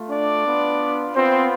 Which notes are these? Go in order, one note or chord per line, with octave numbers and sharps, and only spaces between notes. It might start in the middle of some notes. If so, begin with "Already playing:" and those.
Already playing: A3 F4
D4 D5
B3 F4
B3 C4 F4 C5